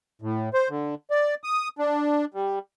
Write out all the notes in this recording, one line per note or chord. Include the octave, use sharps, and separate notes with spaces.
A2
C5
D3
D5
D#6
D4
G3